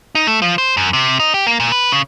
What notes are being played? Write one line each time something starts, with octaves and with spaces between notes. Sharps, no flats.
D#4
A3
F3
C5
F#2
C3
D#4
G4
A#3
A#2
B4
C#3